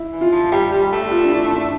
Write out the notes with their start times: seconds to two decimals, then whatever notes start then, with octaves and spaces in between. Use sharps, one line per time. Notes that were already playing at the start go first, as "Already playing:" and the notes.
Already playing: E4
0.12 E3
0.21 F4
0.32 F3
0.52 G3 G4
0.71 G3
0.82 G4
0.92 A3
1.11 F4
1.25 D4
1.32 E4
1.52 D4
1.59 A3